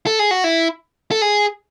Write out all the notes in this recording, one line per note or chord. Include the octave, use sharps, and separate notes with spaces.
A4
G#4
F#4
E4
A4
G#4